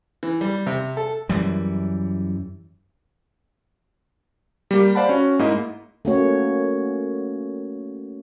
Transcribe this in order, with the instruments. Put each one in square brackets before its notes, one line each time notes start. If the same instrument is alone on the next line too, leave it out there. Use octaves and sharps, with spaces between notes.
[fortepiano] E3
G3
C3
A4
[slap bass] F#2 E3 G3
[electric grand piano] G3 A#3 G4
C5 D5 F5 F#5 A5 B5
C#4 F#4
G#2 A#3 E4 D#5
[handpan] A3 A#3 C#4 F#4 C#5